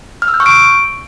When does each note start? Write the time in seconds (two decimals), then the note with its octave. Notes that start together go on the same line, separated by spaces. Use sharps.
0.22 F6
0.28 E6
0.34 G6
0.40 C#6
0.46 D7